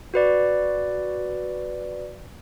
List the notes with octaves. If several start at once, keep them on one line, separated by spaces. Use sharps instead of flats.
F#4 B4 D5